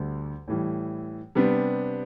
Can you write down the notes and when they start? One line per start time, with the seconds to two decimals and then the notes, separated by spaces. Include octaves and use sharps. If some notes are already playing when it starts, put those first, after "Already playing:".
Already playing: D2 D3 G3
0.48 A2 E3 G3
1.35 C3 G3 B3 D4